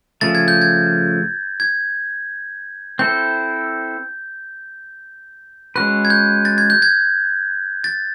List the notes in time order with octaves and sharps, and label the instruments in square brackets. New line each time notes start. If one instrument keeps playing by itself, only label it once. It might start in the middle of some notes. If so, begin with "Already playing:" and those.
[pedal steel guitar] C#3 F3 A3 [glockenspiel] A6
[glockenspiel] G#6
G6
G#6
G#6
[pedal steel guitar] C4 E4 A4 C5 [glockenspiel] G6
[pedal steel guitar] G#3 C#4 F#4 B4 [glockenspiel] F#6
[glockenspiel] G#6
G6
A6
G#6
G6
G#6
A6